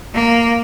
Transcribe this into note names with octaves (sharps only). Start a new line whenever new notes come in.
A#3